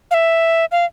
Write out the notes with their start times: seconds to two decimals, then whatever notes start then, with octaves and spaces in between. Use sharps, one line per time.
0.11 F5
0.14 E5
0.72 F5